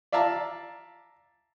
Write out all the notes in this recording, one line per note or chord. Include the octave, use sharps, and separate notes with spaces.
D5 E5 F5 A5 A#5